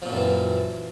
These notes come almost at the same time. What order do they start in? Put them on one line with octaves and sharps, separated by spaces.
F3 A#2 F#2 G3 E3